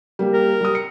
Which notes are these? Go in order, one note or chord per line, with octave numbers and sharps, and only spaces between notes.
G3 A#3 G4
A#4
G3 D#6
C#7